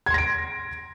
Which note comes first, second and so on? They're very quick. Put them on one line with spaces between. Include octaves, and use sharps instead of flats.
G#6 C6 A#6 D7